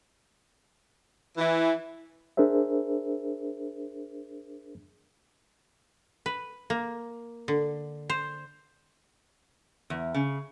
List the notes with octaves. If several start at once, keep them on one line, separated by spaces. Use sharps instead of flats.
E3
D4 G#4 A#4 C5 E5
B4
A#3
D3
C5
E2
C#3